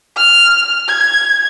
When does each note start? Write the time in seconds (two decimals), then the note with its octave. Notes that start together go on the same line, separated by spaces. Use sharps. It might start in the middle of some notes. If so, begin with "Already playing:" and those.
0.16 F6
0.88 G#6